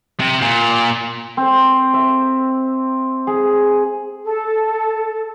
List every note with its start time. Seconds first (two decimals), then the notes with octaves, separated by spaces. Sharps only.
0.20 C3
0.42 A#2
1.37 C4
1.94 E5
3.27 G#4
4.24 A4